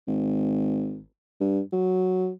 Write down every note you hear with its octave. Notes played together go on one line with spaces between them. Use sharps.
G#1
G2
F#3